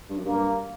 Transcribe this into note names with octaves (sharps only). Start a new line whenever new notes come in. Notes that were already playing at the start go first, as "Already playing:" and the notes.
G2
F#2
G2 A#3